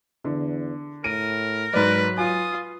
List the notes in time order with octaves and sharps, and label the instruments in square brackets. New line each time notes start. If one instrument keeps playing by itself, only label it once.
[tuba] E2 [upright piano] D3
[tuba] A2 [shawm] A#4 [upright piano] D7 D#7
[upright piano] G#2 D5 [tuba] F#3 [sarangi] B4
[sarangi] F4 [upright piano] G#5 [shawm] D#6